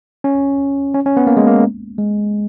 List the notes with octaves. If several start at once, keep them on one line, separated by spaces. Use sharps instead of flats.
C#4
C#4
C#4
B3
A#3
G#3
A#3
G#3